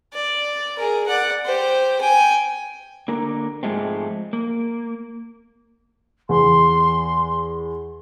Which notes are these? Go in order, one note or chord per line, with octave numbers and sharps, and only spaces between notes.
D5
G#4 A#4
D5 F#5
G4 C5
G5 G#5
D3 A#3 A#4
G#2 F3 G#3 A3 C4
A#3
E2 C6